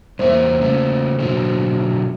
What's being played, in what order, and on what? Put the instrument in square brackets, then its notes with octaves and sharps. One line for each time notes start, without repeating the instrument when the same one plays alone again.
[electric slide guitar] E2 G3 E5 [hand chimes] A#3 C5
[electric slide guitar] C#3 A3
B2 D3 F#3